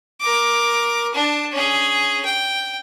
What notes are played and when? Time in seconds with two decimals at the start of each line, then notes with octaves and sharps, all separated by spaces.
0.20 A#4 D6
1.14 D4 A5
1.52 C#4 G#4
2.25 G5